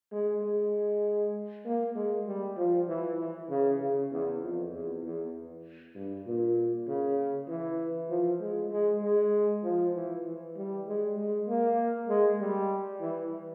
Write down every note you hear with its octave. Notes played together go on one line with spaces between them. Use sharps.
G#3
G#3
A#3
G#3
G3
F3
E3
E3
C#3
C#3
E2
F2
E2
E2
G2
A#2
C#3
E3
F3
G#3
G#3
G#3
F3
E3
E3
G3
G#3
G#3
A#3
G#3
G3
E3